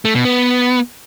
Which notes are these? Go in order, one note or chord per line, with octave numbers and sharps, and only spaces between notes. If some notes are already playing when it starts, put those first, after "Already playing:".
A3
B2
B3